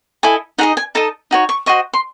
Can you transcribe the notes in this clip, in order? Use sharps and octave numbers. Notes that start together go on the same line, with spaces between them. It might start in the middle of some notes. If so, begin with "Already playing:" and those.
E4 A4 D#5 G#5
D#4 G#4 D#5 F#5
G#5
D#4 A4 D#5 A5
D#4 F#4 C#5
C#6
F#4 C5 D#5 C#6
C6